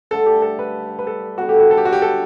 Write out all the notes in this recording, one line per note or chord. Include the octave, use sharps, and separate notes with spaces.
G2 D3 A3 A4
G4
A4
B4
B4
A4
D3 G3 B3 F#4
G4
F#4
A4
G4
F#4
G4
A4